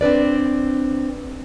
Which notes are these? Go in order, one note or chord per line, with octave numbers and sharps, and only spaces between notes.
C4 D4 B4 D5